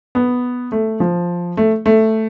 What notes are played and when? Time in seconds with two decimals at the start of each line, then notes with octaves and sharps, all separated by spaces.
0.15 B3
0.72 A3
1.00 F3
1.57 A3
1.86 A3